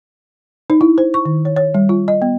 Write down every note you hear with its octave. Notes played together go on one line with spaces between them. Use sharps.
D#4
E4
C5
C#6
D#3
C#5
C#5
G3
F4
D#5
B3